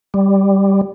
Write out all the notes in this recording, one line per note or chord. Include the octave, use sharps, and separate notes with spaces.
G3